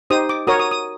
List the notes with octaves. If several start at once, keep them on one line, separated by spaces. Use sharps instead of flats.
D#4 G4 C5 D#6
D6
F#4 A#4 C#5 D#6
D#6
D#6